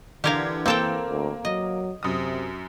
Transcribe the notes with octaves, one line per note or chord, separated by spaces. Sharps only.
D3 E3 G4 A#4 F5 G#6
A#3 C4 A4 G5 E7
D2
F#3 D#5
F#2 C3 D#6